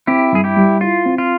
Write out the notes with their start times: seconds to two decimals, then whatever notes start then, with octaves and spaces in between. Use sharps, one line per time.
0.07 C4 E4 G4
0.32 G2 G#4
0.44 E4 G4
0.56 G3
0.81 E4 F4
1.05 C4
1.18 F4